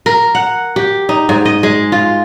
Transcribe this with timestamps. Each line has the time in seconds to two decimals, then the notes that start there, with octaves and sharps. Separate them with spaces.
0.06 A#4
0.35 F#5
0.76 G4
1.09 D#4
1.29 G#2
1.45 D#5
1.63 G#3
1.92 F4